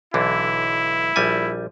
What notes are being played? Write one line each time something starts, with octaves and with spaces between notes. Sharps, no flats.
B1 D3 E3 E4
A#1 G3 G#5